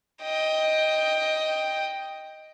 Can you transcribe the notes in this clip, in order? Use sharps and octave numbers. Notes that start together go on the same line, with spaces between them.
D#5 G5